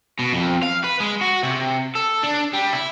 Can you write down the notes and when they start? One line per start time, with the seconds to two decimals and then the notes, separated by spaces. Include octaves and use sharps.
0.19 B2
0.33 F2
0.63 F5
0.84 B4
1.00 G#3
1.21 F#4
1.43 C3
1.95 A4
2.23 D4
2.53 G3
2.73 E4